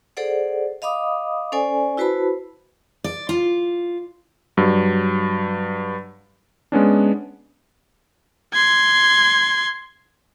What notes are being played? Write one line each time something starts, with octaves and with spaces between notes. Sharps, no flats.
G#4 A4 C5 D5 F#5
D#5 F5 B5 D6 D#6
C#4 A4 C5 D5 G#5
E4 F#4 B4 C5 A5 B5
D5
F4
G2 F#3
G#3 B3 C#4 D4
C6 G#6